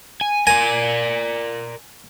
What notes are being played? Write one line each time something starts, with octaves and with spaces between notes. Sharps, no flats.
G#5
A#4 D5 G#5